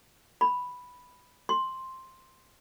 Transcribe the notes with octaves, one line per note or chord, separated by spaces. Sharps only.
B5
C6